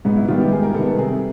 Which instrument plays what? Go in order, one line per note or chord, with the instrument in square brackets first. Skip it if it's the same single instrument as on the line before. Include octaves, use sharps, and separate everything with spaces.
[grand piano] G#2 [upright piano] B3
[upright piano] E4
[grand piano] D#3 G3 B3 [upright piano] F4
[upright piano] G4
[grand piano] G#2 [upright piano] G#4
[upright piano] A#4
[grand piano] D#3 G3 B3 [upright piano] A4
[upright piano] A4
[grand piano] C3 [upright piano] G#4